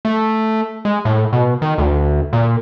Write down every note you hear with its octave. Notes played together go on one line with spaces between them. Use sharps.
A3
G#3
A2
B2
D#3
D2
A#2